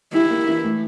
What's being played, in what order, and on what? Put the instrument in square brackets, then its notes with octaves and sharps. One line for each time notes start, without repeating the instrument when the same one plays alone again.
[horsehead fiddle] E4 [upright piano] G4
[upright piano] A#3
E3
A2